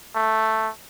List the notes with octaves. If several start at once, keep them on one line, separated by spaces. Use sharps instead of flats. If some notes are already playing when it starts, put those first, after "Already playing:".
A3